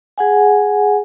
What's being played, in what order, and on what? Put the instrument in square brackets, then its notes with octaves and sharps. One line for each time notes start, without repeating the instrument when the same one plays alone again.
[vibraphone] G#4 F#5 G#5